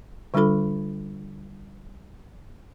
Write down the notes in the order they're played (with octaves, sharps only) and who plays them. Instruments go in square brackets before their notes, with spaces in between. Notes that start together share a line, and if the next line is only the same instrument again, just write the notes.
[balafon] D3 G3 D4 F4 A4 B5